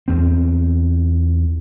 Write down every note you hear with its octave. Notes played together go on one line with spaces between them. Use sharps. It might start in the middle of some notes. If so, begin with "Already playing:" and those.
E2 C4